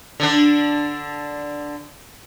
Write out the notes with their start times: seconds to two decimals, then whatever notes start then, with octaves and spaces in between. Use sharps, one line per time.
0.20 D3 D4